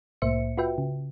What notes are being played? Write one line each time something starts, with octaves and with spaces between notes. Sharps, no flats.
C2 A2 A#3 C5 E5 C#7
F4 F#4 B4 E5 G5
C#3